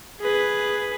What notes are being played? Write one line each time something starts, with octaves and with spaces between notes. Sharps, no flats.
G#4 B4